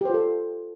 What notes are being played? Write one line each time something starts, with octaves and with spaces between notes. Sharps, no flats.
F4 G4 A4 C5